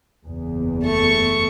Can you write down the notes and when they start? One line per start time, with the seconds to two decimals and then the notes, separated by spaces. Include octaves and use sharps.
0.24 F#1 E2
0.83 A3 C#6